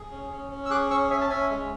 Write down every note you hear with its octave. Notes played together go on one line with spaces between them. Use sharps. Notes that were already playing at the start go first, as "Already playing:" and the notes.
Already playing: G#4
C#4
C#4
C#4
E6
G#4 D6 F#6
C#4 C#6 E6
C#4 E5 G#5
A5
C#4 E5 G#5
G#3